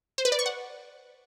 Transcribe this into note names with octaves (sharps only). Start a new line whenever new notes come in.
C5
B4
D5
C#6
F#5